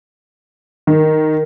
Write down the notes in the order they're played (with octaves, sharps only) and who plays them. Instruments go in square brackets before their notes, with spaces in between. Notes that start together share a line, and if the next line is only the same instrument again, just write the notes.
[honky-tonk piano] D#3 [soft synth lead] A#4